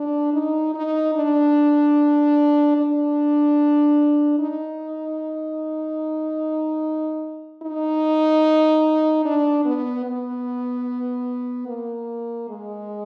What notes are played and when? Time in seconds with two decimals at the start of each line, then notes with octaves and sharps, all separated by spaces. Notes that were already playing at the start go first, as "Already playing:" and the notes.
Already playing: D4
0.33 D#4
0.74 D#4
1.14 D4
2.77 D4
4.39 D#4
7.63 D#4
9.25 D4
9.65 B3
10.06 B3
11.67 A#3
12.49 G#3